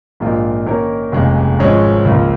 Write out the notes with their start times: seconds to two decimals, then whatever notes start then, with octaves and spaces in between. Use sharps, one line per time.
0.20 A#1 G#2 D#3 A#3 F4
0.66 D#3 A#3 C#4 A#4 C#5
1.12 F1 D#2 C#3 G#3
1.59 G#1 G#2 F3 G#3 C#4
2.05 C#2 C#3 F3 A#3